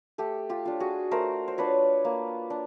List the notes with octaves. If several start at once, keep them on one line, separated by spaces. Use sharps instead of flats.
A3 G4 A4
F4 G4
D4 F4
F#4 G#4
A3 A#4 C5
C5
D4 F4 B4 C#5
A#3
D4